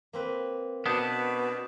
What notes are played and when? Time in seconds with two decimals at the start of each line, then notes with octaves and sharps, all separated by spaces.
0.13 A#3 C4 B4
0.86 B2 B3 D4 D#6 G6 E7